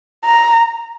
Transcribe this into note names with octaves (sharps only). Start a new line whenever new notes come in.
A#5